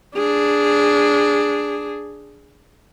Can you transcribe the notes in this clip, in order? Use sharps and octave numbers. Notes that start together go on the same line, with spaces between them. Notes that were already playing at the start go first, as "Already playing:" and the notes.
D4 G#4